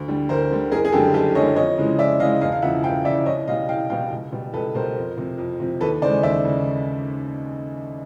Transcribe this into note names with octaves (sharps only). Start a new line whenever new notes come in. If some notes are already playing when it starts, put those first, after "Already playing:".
Already playing: D2
D3 G3
D2 A#4 C5
D3 G3
F#1 G#4 A#4
G#4
F#2 D3 G3 G4 A4
F#1 G4 A4
F#2 D3 G3 C#5 D#5
F2 C#5 D#5
C#3 E3 G#3
F2 D5 E5
C#3 E3 G#3 D#5 F5
E1 D#5 F5
F5
E2 C#3 F3 E5 F#5
E1 F5 G5
E2 C#3 F3 D5 E5
C2 C#5 D#5
B2 G3 D#5 F5
C2 F5 G5
B2 G3 F5 G5
C#2
B2 G3
C#2 A4 B4
B2 G3 A#4 C5
F2
C3 F3
F2
C3 F3
D#2 A4 B4
C#3 E3 G#3 C5 D5
D#2 D5 E5
C#3